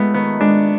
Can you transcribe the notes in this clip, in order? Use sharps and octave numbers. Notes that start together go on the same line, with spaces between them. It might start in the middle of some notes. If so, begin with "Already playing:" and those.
Already playing: G#3 A3 B3 F4
D#3 B3
G#3 D4